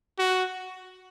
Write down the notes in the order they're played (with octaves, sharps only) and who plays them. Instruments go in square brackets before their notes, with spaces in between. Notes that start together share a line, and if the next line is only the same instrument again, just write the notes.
[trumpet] F#4